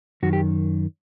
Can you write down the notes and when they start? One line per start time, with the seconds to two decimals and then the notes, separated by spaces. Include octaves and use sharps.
0.23 F#2 D#3 F#4
0.33 G4